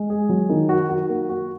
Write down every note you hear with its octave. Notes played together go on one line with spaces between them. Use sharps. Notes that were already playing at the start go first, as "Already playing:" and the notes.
Already playing: G#3
G#4
F#3
D#3
F#4
F#4
A#3
F#4